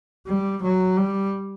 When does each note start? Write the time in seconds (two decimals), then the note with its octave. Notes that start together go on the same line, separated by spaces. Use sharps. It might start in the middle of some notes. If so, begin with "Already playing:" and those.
0.27 G3
0.63 F#3
0.97 G3